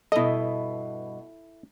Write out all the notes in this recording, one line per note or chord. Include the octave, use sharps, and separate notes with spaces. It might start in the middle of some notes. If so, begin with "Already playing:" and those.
G2 B2 E4 A4 D#5